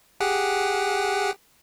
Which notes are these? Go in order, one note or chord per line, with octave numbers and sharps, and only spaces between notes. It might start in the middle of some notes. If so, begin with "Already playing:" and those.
G4 G#4 F#5